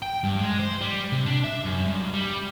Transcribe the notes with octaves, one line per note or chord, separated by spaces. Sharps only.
G5
G2
G#3
C5
G3
C3
D4
E5
F#2
G2
G3